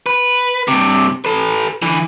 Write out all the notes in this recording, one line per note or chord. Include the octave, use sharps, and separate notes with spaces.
B4
G2 C3
A4 B4
D3 E3